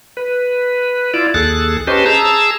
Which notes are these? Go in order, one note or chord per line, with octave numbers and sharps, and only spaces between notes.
B4
E4 F4 D5
D#2 G#4 A4 F#6 A6
C#4 G4 B4 C5 D#5 A5
G#4 A5 A#5 E6